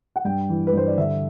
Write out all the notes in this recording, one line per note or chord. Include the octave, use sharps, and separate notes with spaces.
F#5
G2 G5
E3
B4
G2 C5
D5
D3 E5